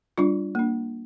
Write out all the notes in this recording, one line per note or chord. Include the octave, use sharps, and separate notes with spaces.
G3 D4 F4
A#3 D4